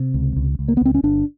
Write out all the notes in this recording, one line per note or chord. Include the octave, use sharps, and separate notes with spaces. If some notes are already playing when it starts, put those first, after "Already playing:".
Already playing: C3
C#2
C#2
C#2
A#3
B3
C#2 C4
C#4
G1 D4